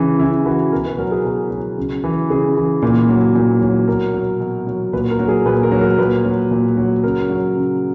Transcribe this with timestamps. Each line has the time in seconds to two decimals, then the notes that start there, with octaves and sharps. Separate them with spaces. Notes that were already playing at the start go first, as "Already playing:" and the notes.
Already playing: C#3 E3
0.19 C#3 E4
0.45 E3 F#4
0.72 B2 A#4
0.85 B4
0.98 F#3 A#4
1.11 G#4
1.24 B2 A#4
1.51 F#3
1.77 C#3
2.04 E3
2.30 C#3 G#4
2.57 E3
2.82 A#2
3.09 F#3
3.35 A#2
3.62 F#3
3.88 B2 A#4
4.14 F#3
4.40 B2
4.67 F#3
4.93 A#2 B4
5.10 A#4
5.19 F#3
5.28 G#4
5.46 A#2 B4
5.63 A#4
5.72 F#3
5.81 A#4
5.98 A#2 B4
6.25 F#3
6.51 A#2
6.77 F#3
7.03 C#3 A#4
7.30 F#3
7.56 C#3